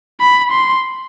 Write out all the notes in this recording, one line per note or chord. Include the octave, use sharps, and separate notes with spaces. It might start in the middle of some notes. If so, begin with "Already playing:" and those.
B5
C6